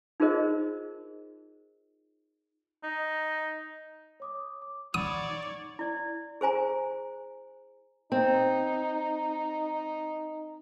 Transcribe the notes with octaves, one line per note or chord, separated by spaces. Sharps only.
D#4 F4 G#4 A#4 C5 D#5
D#4
C#5 D6 D#6
D6
C#5 D5 F#5 B5 D#6
D#4
E4 D5
G#4 C5 G#5 A#5
C4 D#4